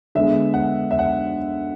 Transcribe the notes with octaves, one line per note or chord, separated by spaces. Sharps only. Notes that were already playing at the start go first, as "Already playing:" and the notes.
D3 G#3 B3 E5
F#5
E5
F#5